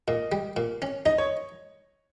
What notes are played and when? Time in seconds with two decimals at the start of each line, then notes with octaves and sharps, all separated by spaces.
0.08 A#2 D#5
0.32 G3
0.57 A#2
0.82 C#4
1.06 D#4 D#5
1.18 C#5